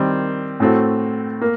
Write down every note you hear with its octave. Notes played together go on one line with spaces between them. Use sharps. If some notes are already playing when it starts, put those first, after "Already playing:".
Already playing: D#3 G3 C4
A2 A3 C4 F#4
A#3